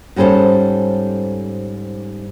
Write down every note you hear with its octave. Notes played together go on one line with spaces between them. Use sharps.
G#2 G3 C#4 F4 A4 C5